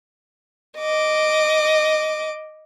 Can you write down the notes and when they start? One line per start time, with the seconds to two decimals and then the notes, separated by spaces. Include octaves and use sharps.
0.79 D#5 D6